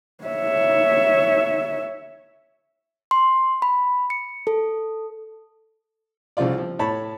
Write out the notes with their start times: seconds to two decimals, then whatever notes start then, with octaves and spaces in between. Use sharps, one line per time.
0.24 C#5 E5
3.11 C6
3.62 B5
4.10 C#7
4.47 A4
6.37 C2 C#3 F3 F4 D5
6.58 F3
6.79 A2 C#5 A5 B5